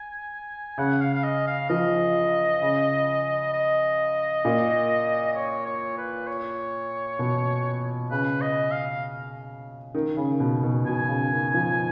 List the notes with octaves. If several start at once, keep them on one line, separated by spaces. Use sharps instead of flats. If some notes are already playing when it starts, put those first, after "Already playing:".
Already playing: G#5
C#3 F#5
F5
F5
D#5
F5
F3 D#5
C#3
D#5
A#2
D#5
C#5
C#5
B4
C#5
B2
C#3 B4
D#5
F5
D#3
C#3
B2
B2
B2 G#5
C#3
D#3
F3